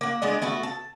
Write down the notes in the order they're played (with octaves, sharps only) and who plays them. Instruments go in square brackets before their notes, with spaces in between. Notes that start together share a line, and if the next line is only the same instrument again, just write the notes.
[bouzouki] A#3 F#5
G#3 B3 D4 D#5
A3 B3 F#4 A4
A5